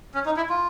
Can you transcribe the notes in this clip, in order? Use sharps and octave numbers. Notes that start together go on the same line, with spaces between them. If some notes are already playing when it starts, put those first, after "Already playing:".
C#4
D#4
E4
F4